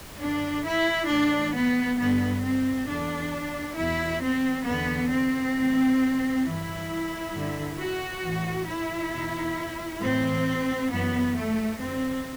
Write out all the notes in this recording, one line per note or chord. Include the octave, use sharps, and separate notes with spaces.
F#2 D3 D4
E4
A2 E3 D4
B3
G2 D3 B3
C4
E2 D3 D4
E2 B2 E4
C4
E2 D3 B3
C4
A2 E3
G2 E3 E4
G2 D3
F#4
A2 E3
E4
E2 B2
A2 E3 C4
F#2 E3 B3
A3
F#2 D3 C4